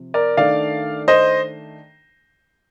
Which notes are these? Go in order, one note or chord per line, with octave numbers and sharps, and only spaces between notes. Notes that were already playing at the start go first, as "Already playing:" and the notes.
Already playing: C3 F3
A#4 D5
D#3 A3 D4 D5 F5
C5 D#5